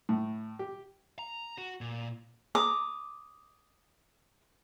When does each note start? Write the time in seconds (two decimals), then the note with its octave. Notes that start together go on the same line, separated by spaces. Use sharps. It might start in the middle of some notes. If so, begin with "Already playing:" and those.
0.09 A2
0.59 G4
1.19 A#5
1.58 F#4
1.81 A#2
2.55 A#5 D6 D#6